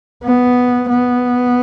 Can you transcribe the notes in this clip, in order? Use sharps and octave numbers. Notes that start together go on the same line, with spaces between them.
B3
B3